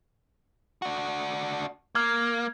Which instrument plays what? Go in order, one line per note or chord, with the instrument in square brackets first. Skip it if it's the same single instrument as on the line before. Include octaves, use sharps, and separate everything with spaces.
[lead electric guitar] D4 F#4
[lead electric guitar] A#3 [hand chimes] F6 G#6